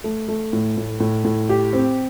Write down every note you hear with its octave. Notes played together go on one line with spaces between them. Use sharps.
A3
A3
A2
A2
A2
A2
G4
C4